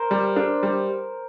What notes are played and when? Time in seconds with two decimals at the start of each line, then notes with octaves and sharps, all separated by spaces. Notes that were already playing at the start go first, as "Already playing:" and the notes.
Already playing: A#4 C5
0.11 G3
0.36 D4
0.63 G3